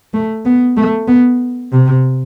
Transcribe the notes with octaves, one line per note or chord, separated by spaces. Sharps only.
A3
B3
A3
B3
C3